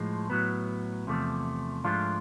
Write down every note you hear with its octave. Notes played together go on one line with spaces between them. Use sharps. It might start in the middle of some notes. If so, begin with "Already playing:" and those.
Already playing: A2 F3 G#3
A2 F#3 B3
E2 C3 F3 A3
G#2 F3 A3 D4 F4